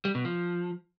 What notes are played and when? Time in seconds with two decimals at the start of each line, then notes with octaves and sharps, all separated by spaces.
0.05 G3
0.15 B2
0.25 F3